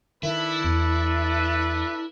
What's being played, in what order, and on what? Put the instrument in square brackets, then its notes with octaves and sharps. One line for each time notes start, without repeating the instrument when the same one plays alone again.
[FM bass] D#3 [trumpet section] D4 A4 B4 [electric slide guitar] E4
[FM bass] E2